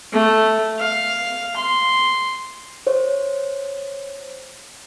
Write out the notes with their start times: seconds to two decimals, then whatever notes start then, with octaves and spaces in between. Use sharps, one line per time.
0.13 A3
0.79 F5
1.57 C6
2.87 C5 C#5